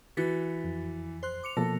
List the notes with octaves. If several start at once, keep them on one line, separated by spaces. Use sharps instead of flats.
E3 F#4 A6 B6
F2
C5 C6 F#6
D6 C#7 F7
B2 F3 A#3 A4 A#6